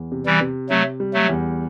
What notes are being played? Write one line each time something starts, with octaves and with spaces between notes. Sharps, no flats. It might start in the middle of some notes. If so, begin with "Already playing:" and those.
Already playing: E2
C3
E3 G3
C3
C3 F#3 A3
G3
F#3 A3
E2